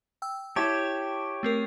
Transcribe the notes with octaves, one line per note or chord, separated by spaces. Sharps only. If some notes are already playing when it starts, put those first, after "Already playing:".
G5 E6
E4 G4 C#5 E5 A5
A3 C4 A#4